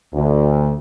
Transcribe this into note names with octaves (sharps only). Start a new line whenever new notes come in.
D2